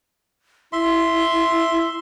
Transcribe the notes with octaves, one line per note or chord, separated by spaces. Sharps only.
E4 E5 C6